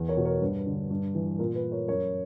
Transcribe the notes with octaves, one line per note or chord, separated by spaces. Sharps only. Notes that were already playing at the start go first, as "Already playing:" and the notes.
Already playing: E2
A#4 C#5
B2
A#4 C#5
G2 B4
D3
G2
E3
A#2 A#4
B4
A#4 C#5
F#2 A#4 C#5